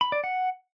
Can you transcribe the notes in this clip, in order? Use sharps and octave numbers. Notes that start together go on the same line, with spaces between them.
B5
D5
F#5